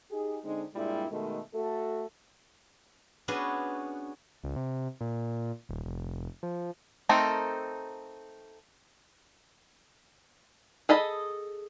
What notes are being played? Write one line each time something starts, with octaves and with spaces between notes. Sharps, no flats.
D#4 G4 G#4
D3 G#3 C4 D#4
G2 A#2 G3 G#3 E4
B2 D#3 G#3 A3
A3 F#4 A4
B3 C#4 D4 F#4 G#4 B4
C#2
C3
A#2
D#1
F1
F3
A3 C4 D#4 A4 A#4
G#4 A4 D#5 B5